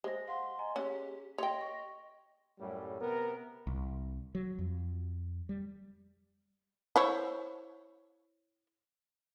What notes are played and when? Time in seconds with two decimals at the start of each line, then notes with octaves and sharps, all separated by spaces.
0.04 G#3 C5 A#6
0.28 F5 F#5 C6
0.59 D#5 G#5 A#5
0.76 C#4 G4 G#4 F#5
1.38 C#5 D#5 G5 C6
1.61 C#6
2.60 F#2 A2 G3
3.01 C3 B3 A#4
3.67 C2
4.35 F#3
4.59 F2
5.49 G3
6.96 E4 C5 C#5